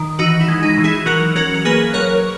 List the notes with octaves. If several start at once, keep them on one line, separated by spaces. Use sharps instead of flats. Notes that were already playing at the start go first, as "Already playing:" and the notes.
Already playing: D#3
E3 D#4 F#4
E4
G#3
D#4
E3
E4 G#4
F#3 F#4 A#4
C#4 F#4 A#4
A#4
A#3 G#4 B4
F#3 A#4 C#5